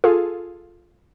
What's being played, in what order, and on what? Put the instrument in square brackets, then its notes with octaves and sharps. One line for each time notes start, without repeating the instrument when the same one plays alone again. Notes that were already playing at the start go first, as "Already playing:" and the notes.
[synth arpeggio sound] F4 G#4 A4